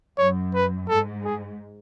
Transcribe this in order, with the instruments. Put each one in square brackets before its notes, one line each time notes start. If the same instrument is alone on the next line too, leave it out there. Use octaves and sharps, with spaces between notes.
[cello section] F#2 [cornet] C#5
[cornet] B4
[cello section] G#2 [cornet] A4
[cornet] G#4